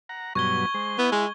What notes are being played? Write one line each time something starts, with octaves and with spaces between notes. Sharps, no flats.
F#5 A#5
G2 B2 F#3 C#6 G#6 G7
G#3 C5
B3 E4
G#3